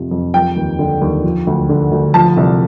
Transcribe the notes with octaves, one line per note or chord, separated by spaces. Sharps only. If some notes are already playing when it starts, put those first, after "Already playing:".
Already playing: F2 C3 F3
F2
F3 G5
D#2
D3
D#2
F3
D2
D3
D2
F3 A5
C2